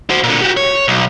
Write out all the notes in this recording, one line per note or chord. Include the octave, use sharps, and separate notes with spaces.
F#4 C5
A#2 D3
F#4 G4
C#5
B1